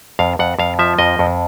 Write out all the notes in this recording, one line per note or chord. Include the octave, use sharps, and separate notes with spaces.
F2 F5
F2 F#5
F2 F5
F3 E5
F2 D#5
F2